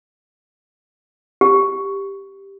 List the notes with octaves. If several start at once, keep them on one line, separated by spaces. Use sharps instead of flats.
G4